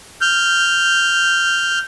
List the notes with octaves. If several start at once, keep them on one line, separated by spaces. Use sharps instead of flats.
F6 G6